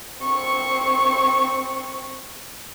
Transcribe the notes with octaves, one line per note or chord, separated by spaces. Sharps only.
C4 C#6